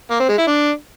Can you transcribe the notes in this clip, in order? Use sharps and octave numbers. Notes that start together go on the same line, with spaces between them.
A#3
C4
G#3
E4
D4